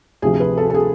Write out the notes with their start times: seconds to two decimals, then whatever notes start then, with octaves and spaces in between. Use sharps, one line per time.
0.22 D2 C3 F3 G#4
0.40 B4
0.57 A4
0.70 A4
0.74 G#4